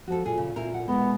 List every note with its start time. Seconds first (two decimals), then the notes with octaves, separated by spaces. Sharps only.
0.08 F3 F#4 A4
0.26 A#2 G#4
0.37 C#3
0.56 A#2 C4 E4 A#4
0.74 F#5
0.88 B2 G#3 B3